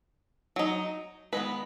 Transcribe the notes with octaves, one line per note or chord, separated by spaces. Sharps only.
F#3 D#4
D#3 G#3 B3 B4